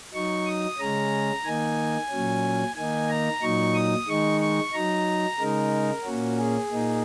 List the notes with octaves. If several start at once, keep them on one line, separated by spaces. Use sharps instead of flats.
F#3 D#4 C#6
D#6
C#3 G#3 C#4 A#5
D#3 A#3 D#4 G#5
A#2 F#3 C#4
D#3 A#3 D#4 G#5
A#5
A#2 F#3 D#4 C#6
D#6
D#3 G#3 D#4 C#6
C#6
F#3 D#4 A#5
C#3 G#3 D#4 A#4
A#2 A#3 C#4 F#4
G#4
A#2 A#3 D#4